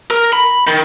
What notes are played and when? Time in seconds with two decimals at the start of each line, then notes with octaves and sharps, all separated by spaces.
0.11 A#4
0.33 B5
0.67 D#3